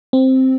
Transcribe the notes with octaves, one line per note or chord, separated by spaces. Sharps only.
C4